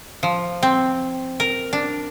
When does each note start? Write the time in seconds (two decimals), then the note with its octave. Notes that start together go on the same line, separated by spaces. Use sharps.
0.23 F3
0.63 C4
1.40 A#4
1.73 D4